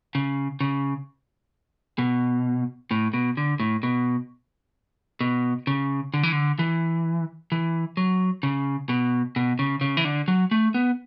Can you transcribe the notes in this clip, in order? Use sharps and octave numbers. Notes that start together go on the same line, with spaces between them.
C#3
C#3
B2
A2
B2
D3
A2
B2
B2
C#3
D3
E3
D3
E3
E3
F#3
C#3
B2
B2
C#3
C#3
E3
D3
F#3
A3
B3